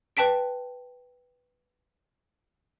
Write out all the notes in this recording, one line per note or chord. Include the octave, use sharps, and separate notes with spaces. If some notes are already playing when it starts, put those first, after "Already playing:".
B4 G5 A5 B6 D7